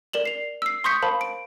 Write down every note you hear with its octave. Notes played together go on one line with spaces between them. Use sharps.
A#4 D5 E7 F#7
C7 F7
E6 C7
C6 C#6 D#6 G6 B6 C#7
A#4 C5 F5 A5 B5
D7